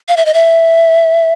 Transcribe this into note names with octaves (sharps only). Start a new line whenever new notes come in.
F5
E5
D#5
E5